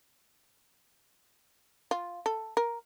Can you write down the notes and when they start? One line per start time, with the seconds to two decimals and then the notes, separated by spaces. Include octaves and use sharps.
1.91 F4
2.26 A4
2.57 A#4